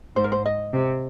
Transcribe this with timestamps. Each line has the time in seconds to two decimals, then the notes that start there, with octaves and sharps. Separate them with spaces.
0.16 G#2 C5
0.24 A#4
0.32 C5
0.46 D#5
0.73 C3